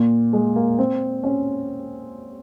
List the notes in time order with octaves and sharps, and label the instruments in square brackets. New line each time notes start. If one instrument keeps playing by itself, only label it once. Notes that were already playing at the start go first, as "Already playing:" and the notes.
Already playing: [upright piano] A#2
G#3
A#3
C4
C#4